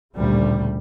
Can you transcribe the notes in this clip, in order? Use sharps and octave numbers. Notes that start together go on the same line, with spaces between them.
A1 D2 A#2 C#3 G3